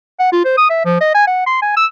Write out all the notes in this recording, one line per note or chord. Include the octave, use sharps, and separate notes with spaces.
F#5
F4
C5
D#6
E5
F3
D#5
G#5
F#5
C6
G#5
E6